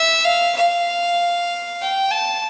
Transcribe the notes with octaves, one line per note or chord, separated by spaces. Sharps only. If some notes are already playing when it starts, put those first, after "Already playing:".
Already playing: E5
F5
F5
G5
A5